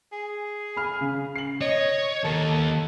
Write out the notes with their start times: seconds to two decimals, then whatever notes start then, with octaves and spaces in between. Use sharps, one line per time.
0.12 G#4
0.77 B5 F6
1.01 C#3
1.36 C7 F#7
1.61 C#5 D#5
2.24 D#2 A4 A#4